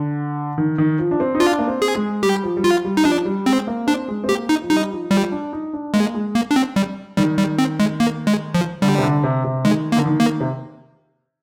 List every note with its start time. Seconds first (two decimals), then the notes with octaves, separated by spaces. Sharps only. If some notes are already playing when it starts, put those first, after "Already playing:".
Already playing: D3
0.58 D#3
0.78 D#3
0.99 F3
1.11 D4
1.20 C4
1.35 D#4
1.40 D4 F4
1.59 A#3
1.68 C4
1.82 G#4
1.95 G#3
2.23 G3 G4
2.43 F3
2.57 G3
2.64 F3 F4
2.85 G3
2.97 D#4
3.05 F3 D4
3.25 G3
3.46 G#3 C4
3.67 A#3
3.87 C4 D4
4.08 G#3
4.24 C4
4.29 A#3 G4
4.49 D#4
4.62 F3
4.70 G3 D#4
4.91 F3
5.11 F3 G3
5.32 D4
5.53 D#4
5.73 D4
5.94 G#3 A#3
6.14 G#3
6.35 A#3
6.51 D4
6.56 C4
6.76 G3
7.17 D#3 G3
7.38 G3
7.58 C4
7.80 G#3
8.00 A#3
8.27 G#3
8.55 F3
8.82 D3 G3
8.98 C3
9.03 D3
9.23 C3
9.44 C3
9.65 D#3 G#3
9.92 A#3
9.96 D3
10.06 D#3
10.20 A#3
10.40 C3